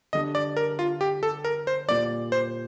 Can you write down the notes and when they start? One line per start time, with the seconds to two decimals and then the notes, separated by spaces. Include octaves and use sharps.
0.13 D3 G3 D4 D#5
0.35 D5
0.57 A#4
0.79 F4
1.01 G4
1.23 A4
1.45 A#4
1.67 C5
1.88 A#2 G3 A#3 D5
2.32 C5